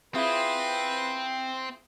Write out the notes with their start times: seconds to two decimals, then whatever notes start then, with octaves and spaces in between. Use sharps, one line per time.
0.15 C4 E4 F4 G#4 B4